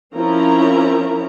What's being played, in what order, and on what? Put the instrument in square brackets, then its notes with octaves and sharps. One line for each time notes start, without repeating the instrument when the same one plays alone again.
[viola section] F3 C4 C#4 E4 A#4 A#5